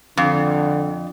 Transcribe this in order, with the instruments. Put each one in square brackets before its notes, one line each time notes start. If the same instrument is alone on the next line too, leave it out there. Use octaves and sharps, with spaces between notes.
[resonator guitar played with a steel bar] F2 [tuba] D3